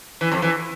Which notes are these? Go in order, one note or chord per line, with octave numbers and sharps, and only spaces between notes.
E3
F2
E3